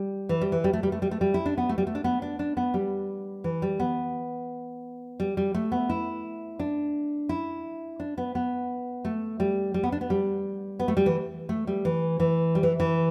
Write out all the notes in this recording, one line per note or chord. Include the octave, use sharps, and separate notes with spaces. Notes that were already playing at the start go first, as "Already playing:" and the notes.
Already playing: G3
E3
G3
E3
G3
A3
G3
A3
G3
A3
G3
E4
D4
B3
A3
G3
A3
D4
B3
D4
D4
B3
G3
E3
G3
B3
G3
G3
A3
B3
E4
D4
E4
D4
B3
B3
A3
G3
G3
B3
D4
B3
G3
B3
A3
G3
E3
A3
G3
E3
E3
G3
E3
E3